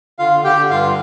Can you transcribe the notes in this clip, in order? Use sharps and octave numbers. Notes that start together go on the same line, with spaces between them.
D3 F4 F5
D3 G4 G5
G2 F4 F5